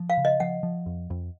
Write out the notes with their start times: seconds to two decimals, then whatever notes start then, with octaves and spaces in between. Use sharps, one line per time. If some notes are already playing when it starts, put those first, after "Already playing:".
Already playing: F3
0.10 F5
0.17 C#3
0.25 D#5
0.40 F3 F#5
0.63 F3
0.86 F2
1.10 F2